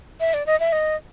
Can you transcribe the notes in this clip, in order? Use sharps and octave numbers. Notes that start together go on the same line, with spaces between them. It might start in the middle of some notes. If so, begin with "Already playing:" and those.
E5
D5
D#5
E5
D#5